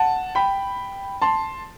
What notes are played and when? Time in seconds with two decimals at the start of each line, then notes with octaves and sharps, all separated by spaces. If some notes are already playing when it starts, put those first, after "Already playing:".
Already playing: F#5 A5
0.35 G5 B5
1.22 A5 C6